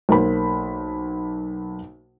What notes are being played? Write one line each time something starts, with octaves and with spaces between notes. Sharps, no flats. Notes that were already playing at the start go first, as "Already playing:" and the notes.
B1 A#3 C5 B5